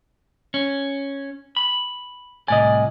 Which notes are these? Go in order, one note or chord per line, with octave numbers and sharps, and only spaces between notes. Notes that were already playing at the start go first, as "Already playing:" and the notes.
C#4
B5
C2 A2 D5 D#5 G#5